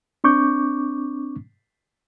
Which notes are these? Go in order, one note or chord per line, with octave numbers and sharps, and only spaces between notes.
C4 D4 C#6 D6 G6